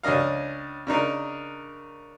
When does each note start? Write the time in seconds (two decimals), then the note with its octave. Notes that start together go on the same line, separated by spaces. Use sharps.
0.03 C#2 C#4 D4 D#5 F5
0.87 C#3 D4 D#4 A#4